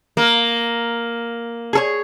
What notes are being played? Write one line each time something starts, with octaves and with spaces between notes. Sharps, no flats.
A#3
G#4 A4 C#5